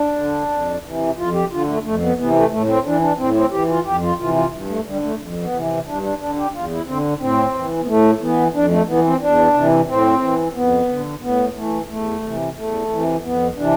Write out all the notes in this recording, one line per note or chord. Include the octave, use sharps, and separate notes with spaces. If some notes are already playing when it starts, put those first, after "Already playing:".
Already playing: D4
D3
F2
C3 E3
F2 F4
G4
D3 F4
A3
F2 A3
B3
C3 E3 B3
A3
A2 A3
C4
E3 D4
D4
A2 C4
C4
E3 G4
F4
F2 G4
F4
C3 E3 F4
F4
G2
A3
D3 G3
A3
F2
B3
C3 E3
G2 D4
D4
D3 D4
G4
E2 F4
E4
D3 C4
A2 C4
E3
B3
A2 A3
E3 B3
F2 D4
A3
E3 B3
C4
E2 D4
C3 E3
A2 C4
E3
F2 B3
D3
A2 B3
E3 A3
E2 A3
C3 E3
E2 A3
C3 E3
F2 B3
C3 E3 D4